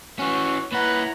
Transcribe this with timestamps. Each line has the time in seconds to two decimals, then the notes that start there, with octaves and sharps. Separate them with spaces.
0.19 E3 C#4 F#4
0.72 A#2 E4 B4 C#5 F#5 A#5